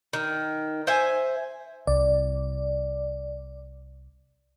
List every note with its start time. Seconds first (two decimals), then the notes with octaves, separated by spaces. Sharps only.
0.13 D#3
0.87 C5 E5 G#5
1.87 C2 D5